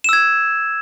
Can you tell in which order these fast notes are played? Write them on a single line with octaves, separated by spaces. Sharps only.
E7 E6 G#6